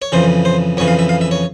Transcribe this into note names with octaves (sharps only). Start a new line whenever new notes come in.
C#5
F2 C#3 E3 C5
C5
F2 C#3 E3 C#5
F5
E5
F5
E5
C#5